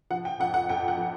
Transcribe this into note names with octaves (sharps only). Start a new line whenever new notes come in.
F3 F#5
G5
F2 F#5
F#5
F2 G5
F#5
F3